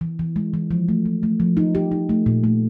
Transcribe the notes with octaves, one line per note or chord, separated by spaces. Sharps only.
E3
E3
G#3
E3
F3
A3
F3
A3
F3
D#4
G4
D#4
A3
A#2
A3